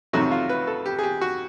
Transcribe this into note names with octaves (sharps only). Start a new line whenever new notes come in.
F2 C3 D#3 F#3 A3 F#4
F4
B4
A4
G4
G#4
G4
F#4